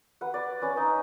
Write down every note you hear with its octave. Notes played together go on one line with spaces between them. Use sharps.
B4 F#5
D5
C#4 B4 D5
D#4